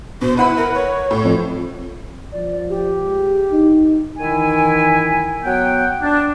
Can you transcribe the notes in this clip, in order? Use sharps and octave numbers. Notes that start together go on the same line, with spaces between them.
B2 C5
E4 B4 F#5 B5
A#4
C#5
A2
F2
F3 D5
G4
G#3
D#4
D#3 E3 E4 G#5
F#3 B3 F#5 G5
D4